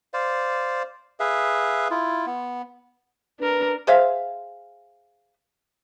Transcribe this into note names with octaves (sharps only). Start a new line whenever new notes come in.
C5 D5 F5
G#4 B4 E5 F5
E4 F4
B3
D4 A#4 B4
G#4 C5 E5 F5